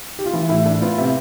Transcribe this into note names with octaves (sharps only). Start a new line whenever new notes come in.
G4
F4
E3 E4
A2 E4
A2 D4
B3 F4
C3